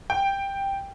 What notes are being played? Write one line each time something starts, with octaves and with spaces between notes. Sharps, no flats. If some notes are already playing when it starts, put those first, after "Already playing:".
G5